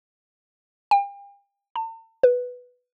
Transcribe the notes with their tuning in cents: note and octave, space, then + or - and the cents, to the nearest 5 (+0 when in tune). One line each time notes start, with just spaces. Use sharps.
G5 +40
A5 +45
B4 +0